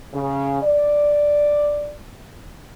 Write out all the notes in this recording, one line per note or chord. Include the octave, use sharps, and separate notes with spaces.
C#3
D5